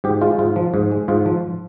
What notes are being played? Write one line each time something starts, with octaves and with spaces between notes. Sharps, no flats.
G#2 G4
G#3 F4
G#2 F4
F3
G#2
G#3
G#2 F4
F3